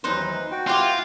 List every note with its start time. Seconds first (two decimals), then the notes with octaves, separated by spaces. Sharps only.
0.04 D#2 E3 F#3 D#4 B4 C5
0.51 F#4 G5
0.67 E4 F4 G4 B4